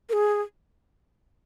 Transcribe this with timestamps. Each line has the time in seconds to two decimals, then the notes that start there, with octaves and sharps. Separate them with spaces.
0.09 A#4
0.13 G#4